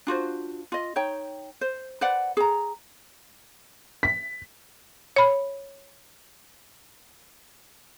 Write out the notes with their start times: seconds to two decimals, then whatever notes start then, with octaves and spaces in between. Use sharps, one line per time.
0.07 D4 F4 F#4 C5
0.72 F4 D#5
0.96 D#4 C#5 G5
1.61 C5
2.01 B4 C5 D5 F#5
2.37 G#4 A#5
4.03 B6
5.16 C#5 B5